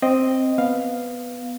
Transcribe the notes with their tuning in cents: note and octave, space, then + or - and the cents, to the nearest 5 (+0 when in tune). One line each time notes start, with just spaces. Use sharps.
C4 +0 D#5 +0
B3 +0 F5 +0